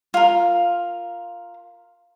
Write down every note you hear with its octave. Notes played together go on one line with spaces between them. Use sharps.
F4 A#4